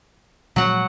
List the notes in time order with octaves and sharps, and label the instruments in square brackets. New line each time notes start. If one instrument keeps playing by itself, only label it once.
[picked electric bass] A#2 F3 G#3 [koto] F#3 F#5